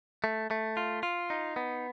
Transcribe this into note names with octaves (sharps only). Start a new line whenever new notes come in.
A3
A3
F4
F4
D#4
B3